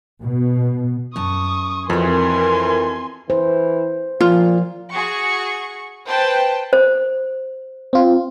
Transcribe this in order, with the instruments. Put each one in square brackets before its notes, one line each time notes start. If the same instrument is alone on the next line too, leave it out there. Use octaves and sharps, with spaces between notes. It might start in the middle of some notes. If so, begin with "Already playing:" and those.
[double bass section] B2
[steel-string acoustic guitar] F#2 A5 [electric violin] C#6 D#6
[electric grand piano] F2 [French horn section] E3 A#4 [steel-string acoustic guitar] C4 F#4 [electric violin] G#5 C6
[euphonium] E3 [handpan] C5
[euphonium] A#2 [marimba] F3 [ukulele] F4
[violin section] F#4 G#4 C#6
B4 C5 G5 A5
[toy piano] C5
[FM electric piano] C4 F4